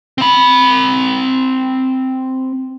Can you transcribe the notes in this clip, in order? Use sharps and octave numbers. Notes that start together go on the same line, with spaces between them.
C4 B5